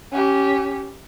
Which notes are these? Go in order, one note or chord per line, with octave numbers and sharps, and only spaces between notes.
C#4 G4